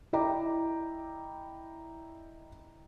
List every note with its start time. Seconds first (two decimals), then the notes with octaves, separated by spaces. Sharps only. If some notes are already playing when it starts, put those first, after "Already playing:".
0.13 E4 D5 D#5 G5 A#5 D6